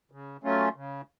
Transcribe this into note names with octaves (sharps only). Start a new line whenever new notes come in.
C#3
F#3 A3 C#4 F4
C#3